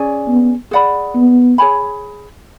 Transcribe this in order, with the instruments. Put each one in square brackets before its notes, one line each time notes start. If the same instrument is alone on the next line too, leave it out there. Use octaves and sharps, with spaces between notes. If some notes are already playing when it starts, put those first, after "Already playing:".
Already playing: [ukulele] C#4 G#4 D5 G#5
[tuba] B3
[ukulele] G#4 D5 F#5 B5
[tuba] B3
[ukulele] G#4 C#5 G#5 B5